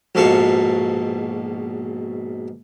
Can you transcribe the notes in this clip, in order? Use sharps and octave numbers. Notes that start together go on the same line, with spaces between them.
A#1 G#2 B2 A4 F5 C#6